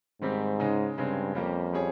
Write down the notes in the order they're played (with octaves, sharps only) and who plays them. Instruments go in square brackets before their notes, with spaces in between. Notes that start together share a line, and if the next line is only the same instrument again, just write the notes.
[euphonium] G#2 [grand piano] D#3 G3 C4 G4
[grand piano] C#3 G#3 D#4
[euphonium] G2 [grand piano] C#3 G#3 C4
[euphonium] F2 [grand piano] G3 A#3 C#4 G4
[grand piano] G3 C#4 G#4 C#5